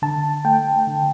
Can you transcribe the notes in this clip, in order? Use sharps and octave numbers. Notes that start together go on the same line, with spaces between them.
D3 A5
A3 G5
D3